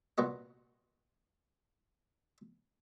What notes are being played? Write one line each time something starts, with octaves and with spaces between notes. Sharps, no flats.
C2 A#2 B3 F#4 D#5